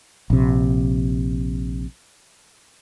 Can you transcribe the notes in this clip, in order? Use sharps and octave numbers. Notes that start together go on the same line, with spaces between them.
A#1 C3